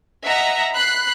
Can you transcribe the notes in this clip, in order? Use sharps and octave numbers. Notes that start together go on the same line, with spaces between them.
D#5 E5 F#5 A#5 A#6
B5 F#6 C7